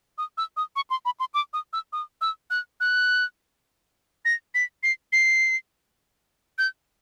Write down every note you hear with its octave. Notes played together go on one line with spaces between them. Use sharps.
D#6
E6
D#6
C#6
C6
B5
C6
D6
D#6
E6
D#6
E6
F#6
F#6
A#6
B6
C7
C7
G6